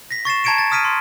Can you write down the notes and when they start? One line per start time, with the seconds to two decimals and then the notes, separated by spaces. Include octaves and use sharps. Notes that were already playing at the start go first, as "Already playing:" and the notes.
0.11 A#6 B6
0.25 C#6 A6 C7 E7
0.44 A5 A#5 G#6 C#7 D7 E7
0.58 A6
0.72 D#6 F6 B6 D7 D#7
0.85 C6